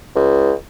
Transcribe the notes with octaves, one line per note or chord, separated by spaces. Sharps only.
C#2